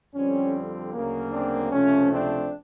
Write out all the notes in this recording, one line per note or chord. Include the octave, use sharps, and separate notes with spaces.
F2 D3 G3 C4 C#4
D2 C#3 F#3 A#3
C4 D4
C#2 C3 F3 A3 C#4
C4 D4